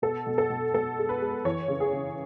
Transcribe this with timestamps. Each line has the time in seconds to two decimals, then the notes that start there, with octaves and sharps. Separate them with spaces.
0.02 B2 A4
0.26 B2
0.38 A4
0.50 B2
0.74 B2 A4
0.98 G#3
1.09 B4
1.21 G#3
1.45 E3 C#5
1.68 C#3
1.80 G#4
1.93 C#3